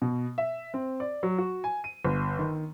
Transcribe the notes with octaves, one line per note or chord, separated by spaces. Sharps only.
B2
E5
C4
D5
F#3
F#4
G#5
D#7
G1
D#3